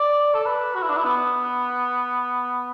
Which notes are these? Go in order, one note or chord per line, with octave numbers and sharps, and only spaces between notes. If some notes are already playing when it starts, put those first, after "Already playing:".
Already playing: D5
A4
B4
F#4
E4
D4
E4
B3